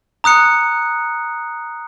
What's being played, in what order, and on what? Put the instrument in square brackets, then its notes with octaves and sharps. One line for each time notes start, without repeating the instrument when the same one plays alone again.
[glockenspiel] A#5 D#6 F#6 C#7